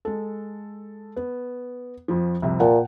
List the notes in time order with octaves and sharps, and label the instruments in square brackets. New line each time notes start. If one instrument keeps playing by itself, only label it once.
[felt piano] G#3 A4
B3
F2 F3
C2 F2 C3
[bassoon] A#2 [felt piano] F#5 G5 A5